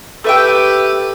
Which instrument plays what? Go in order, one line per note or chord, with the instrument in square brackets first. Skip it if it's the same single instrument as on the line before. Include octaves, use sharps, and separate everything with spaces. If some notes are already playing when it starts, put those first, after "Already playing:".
[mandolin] A3 E5 G5 [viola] G4 B4